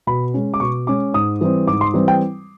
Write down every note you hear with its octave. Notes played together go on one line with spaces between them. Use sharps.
B2 B5
G#3 C#4
D6
B2 C#6
G#3 C#4 D6
G#2 D#6
E3 G3 C4
G#2 D6
C6
E3 G3 C4
G5